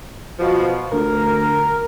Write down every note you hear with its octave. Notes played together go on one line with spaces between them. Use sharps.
B2 F3
D2 A#4